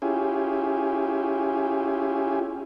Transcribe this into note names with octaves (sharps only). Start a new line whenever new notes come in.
C#4 E4 F4 G4 G#4